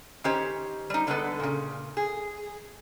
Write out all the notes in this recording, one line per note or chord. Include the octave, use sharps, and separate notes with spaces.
D#3 C#4 G4 C5 C#5
G3 D#4
D3 G3 G#3 B3 A4 B4
A#2 C#3
G#4